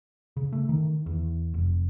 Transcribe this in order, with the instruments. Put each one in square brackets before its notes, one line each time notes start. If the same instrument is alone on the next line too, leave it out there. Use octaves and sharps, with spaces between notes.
[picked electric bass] C#3
A3
D#3
E2
F1